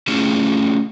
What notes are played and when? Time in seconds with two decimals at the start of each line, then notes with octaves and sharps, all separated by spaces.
0.08 A3 C#4 E4 F4 G4 G#4